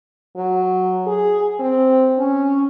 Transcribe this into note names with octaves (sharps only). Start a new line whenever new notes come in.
F#3
G#4
C4
C#4